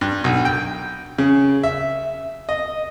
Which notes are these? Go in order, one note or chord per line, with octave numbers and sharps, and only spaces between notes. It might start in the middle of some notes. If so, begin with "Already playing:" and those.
G2
B1
G5
C#3
E5
D#5